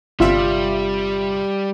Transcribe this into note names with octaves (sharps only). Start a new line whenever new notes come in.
G1 C3 G3 F4 E5